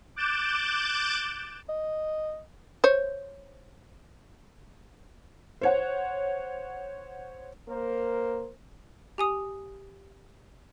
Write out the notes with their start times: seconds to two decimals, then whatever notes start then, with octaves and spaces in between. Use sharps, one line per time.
0.16 D6 F#6 G6 A6 D7 E7
1.69 D#5
2.84 C5 C#5
5.61 C5 C#5 F#5
7.68 A#3 A#4 C5
9.18 G4 G#5 D#6